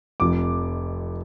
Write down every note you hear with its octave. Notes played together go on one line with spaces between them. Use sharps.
F1 F2 F3 D6